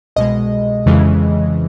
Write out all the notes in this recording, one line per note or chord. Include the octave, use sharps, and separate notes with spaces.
C2 B2 G#3 D#5
F2 C#3 E3 G#3